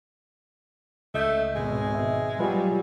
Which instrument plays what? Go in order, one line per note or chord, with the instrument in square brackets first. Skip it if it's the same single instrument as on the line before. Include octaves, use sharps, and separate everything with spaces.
[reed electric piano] C#2 D#5 G6 [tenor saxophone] A3
[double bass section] G#1 B2 [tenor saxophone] G#3
[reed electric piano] E5
[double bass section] F#3 G3 [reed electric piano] F4 B4 G#5